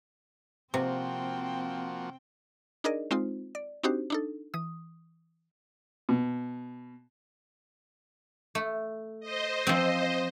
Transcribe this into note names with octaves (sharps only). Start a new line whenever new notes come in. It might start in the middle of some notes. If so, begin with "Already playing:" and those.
C3 F3 A#3 C4 F#4 G5
D4 D#4 G#4 A#4 D5 D#5
G#3 C4 D#4 F4 C5
D5
C4 D4 D#4 F#4 G4 C5
D4 D#4 A4
E3 D#6
B2
A3
C5 D#5
F3 C4